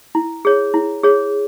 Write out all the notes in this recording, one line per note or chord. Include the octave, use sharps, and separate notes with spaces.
E4
G#4 C#5
E4
G#4 C#5